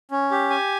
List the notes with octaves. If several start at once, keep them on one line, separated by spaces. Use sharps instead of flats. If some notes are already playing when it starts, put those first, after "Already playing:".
C#4
G4
G#5